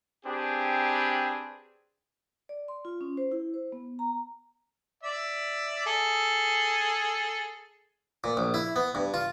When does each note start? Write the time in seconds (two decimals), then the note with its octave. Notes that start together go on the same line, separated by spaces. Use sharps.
0.25 C4 D4 G4 G#4 B4
2.49 D5
2.68 C6
2.85 F4
3.01 C#4
3.17 C5
3.31 E4
3.54 C5
3.72 B3
3.99 A#5
5.03 D5 E5
5.86 G#4 A4
8.24 A#2
8.37 A#1
8.54 E4
8.76 B3
8.95 G2
9.14 F4